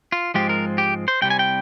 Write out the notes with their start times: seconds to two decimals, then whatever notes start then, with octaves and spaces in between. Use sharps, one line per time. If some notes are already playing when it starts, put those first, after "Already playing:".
0.12 F4
0.34 G#2 F3 G#3 C4 F4 G4
0.49 A#4
0.78 G4
1.08 C5
1.22 C2 C3 G3 G5
1.30 G#5
1.39 G5